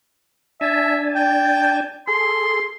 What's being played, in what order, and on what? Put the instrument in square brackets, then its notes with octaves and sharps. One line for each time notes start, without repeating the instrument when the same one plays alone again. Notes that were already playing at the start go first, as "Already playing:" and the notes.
[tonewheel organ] D4 G#5 A5 [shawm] E5
[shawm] G5
[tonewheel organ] G#4 A4 [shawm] C6